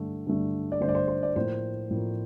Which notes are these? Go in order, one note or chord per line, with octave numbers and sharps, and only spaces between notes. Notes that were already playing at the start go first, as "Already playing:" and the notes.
Already playing: G2 D3 A3
G2 D3 A3
D5
G2 D3 A3 C5
D5
C5
C5
D5
A2 F3 A#3 C5
A2 F3 A#3